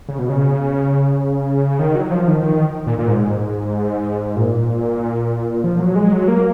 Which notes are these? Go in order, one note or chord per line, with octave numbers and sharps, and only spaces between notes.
C#3
B2
C#3
D#3
F#3
F3
D#3
D#3
A#2
A#2
G#2
A#2
F3
F#3
G#3
F#3
A#3